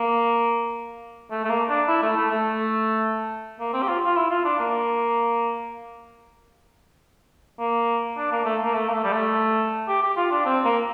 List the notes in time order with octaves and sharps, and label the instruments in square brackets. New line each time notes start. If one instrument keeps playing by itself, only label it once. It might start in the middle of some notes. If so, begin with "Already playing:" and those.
Already playing: [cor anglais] A#3
A3
A3
A#3
D4
E4
A3
A3
A3
A#3
C4
G4
F4
F4
E4
F4
D4
A#3
A#3
D4
A#3
A3
A#3
A3
A#3
A3
G3
A3
G4
G4
F4
D4
C4
A#3